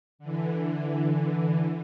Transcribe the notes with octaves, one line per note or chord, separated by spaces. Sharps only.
D3 E3